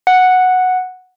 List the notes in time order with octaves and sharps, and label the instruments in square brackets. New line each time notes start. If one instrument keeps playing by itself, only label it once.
[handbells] F#5